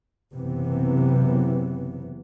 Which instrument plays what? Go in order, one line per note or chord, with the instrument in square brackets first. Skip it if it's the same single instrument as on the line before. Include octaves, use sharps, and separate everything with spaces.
[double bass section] F#1 C3 E3 B3